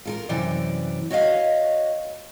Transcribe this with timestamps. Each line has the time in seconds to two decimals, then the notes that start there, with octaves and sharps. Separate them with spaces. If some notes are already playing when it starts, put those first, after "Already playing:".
0.05 F4 A4 A#4
0.29 F#2 C3 E3 D5
1.10 F#4 C#5 D#5 F5